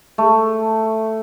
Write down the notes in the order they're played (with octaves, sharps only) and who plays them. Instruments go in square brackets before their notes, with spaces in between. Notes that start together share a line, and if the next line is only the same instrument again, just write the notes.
[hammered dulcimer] A3